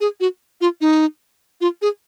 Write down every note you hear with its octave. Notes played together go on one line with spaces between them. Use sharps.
G#4
F#4
F4
D#4
F4
G#4